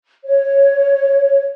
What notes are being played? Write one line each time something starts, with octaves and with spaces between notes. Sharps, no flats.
C#5